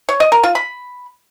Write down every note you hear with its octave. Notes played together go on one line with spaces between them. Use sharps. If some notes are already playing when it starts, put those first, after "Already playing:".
C#5
D#5
A#4
F4
B5